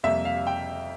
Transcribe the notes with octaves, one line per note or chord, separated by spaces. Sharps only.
F2 C3 G3 A#3 E5
F5
F5
G5